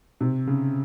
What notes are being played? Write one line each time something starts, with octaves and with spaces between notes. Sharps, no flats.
C3
C#3